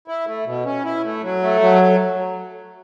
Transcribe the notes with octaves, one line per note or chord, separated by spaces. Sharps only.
E4
A3
B2
C#4
E4
A3
F#3
A3
F#3